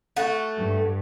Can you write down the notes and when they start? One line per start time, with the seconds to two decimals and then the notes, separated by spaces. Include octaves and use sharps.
0.16 A3 F#4
0.57 G2